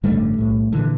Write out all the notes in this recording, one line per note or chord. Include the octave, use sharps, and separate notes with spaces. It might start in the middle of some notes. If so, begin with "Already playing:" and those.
A1 G2 D3 G3 A3
B1 A2
A#2 D3 E3